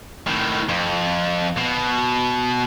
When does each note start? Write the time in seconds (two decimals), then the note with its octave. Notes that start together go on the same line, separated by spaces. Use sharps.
0.27 A2 D#3
0.69 F2
1.58 B2